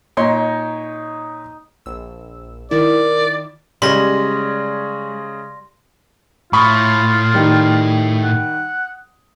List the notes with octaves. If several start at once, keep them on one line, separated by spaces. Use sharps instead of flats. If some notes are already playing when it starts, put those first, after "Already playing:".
A#2 D#4 C#5 C6
A#1 E6
D#3 E4 A#4 D5
C#3 G3 G#3 C#4 C6 A#6
A2 F4 B5 C#6 D#6
D#3 G3
F#5